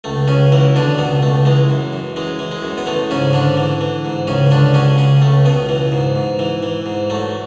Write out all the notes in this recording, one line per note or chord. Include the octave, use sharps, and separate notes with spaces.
C#2 A3
C#2 C#3 C#4
E3 F#3 E4
B2 D3 D4
C#2 B2 B3
C#2 A3
E3 G#3
F#2
F#2
E3 G#3
E3
G#3
F#2
B3
E3 A3
G#2 C#3 C#4
G#2 D3 D4
E3
E3
G#2
C#2 C#3 C#4
C#2 D3 D4
C#3 F#3 C#4
C#3 C#4
C#2 A3
C#2 B2 B3
E3
G#2
G#2
E3
E3
G#2
F#3 A3